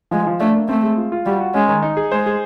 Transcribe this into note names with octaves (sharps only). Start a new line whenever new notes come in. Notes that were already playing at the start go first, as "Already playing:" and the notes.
F3 G#3
F3
A3 D4
A#3
A3 C4
G#3
F4
F4
G3 F#4
F#4
G#3 C#4
D#3
D#4
G#4
G#3 C5
G#4